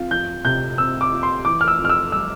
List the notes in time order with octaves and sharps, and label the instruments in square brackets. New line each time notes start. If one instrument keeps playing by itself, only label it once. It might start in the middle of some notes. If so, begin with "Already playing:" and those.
Already playing: [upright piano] C4 F4
[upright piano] F3 [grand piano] G6
[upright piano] C3 [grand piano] G6
[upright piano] C4 [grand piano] E6
[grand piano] D6
[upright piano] F4
[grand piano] C6
[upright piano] E3 [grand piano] D6
[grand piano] F6
E6
[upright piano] F2
[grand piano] F6
E6
[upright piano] G3 [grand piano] E6